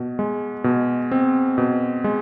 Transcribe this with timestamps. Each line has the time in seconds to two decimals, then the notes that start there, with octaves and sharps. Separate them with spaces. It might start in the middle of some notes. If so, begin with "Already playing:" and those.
Already playing: B2
0.19 G#3
0.64 B2
1.11 C4
1.58 B2
2.04 G#3